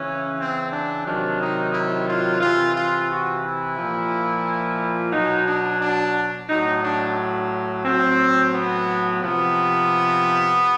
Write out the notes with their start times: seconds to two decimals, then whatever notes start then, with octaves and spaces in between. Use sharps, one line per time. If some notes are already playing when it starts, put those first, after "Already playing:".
Already playing: C#3 E3 C#4
0.37 C4
0.72 D4
1.05 C3 D#3 F#3 D4
1.39 D#4
1.73 E4
2.07 F4
2.41 C3 E3 F4
2.76 F4
3.09 F#4
3.43 E4
3.77 A#2 F3
5.12 B2 F#3 D#4
5.46 D4
5.80 D4
6.48 A2 F#3 D#4
6.82 D4
7.84 A2 F#3 C4
8.52 B3
9.19 C3 F3 B3